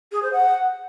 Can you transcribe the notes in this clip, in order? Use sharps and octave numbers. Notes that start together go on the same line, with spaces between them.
G#4
C5
F#5